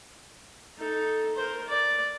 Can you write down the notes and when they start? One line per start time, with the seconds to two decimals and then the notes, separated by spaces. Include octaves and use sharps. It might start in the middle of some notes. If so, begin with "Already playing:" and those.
0.78 D#4 A4
1.35 A#4 C5
1.68 D5